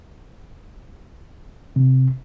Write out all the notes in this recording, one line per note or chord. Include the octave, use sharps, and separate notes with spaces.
C3